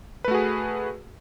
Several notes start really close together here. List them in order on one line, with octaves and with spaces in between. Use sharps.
B4 A3 F#4 G#4